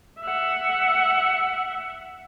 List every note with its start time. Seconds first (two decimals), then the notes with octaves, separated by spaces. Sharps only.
0.21 E5 F#5